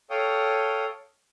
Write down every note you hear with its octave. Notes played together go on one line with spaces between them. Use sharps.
A4 C#5 F5 G5 D#6